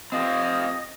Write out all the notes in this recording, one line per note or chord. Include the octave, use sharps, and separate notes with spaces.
C4 F4 G4 D#5